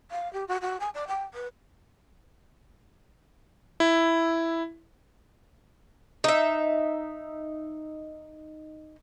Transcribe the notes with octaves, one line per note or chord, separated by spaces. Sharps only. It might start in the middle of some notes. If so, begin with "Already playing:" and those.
F5
G4
F#4
F#4
G#5
D5
G5
B4
E4
D#4 E5